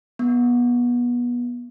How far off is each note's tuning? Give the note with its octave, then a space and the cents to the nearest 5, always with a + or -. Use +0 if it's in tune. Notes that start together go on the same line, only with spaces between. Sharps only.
B3 -25